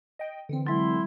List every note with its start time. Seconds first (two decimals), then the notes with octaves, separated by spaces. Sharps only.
0.19 D#5 G5
0.49 D3 E3 C4
0.67 F#3 G#3 E4 C6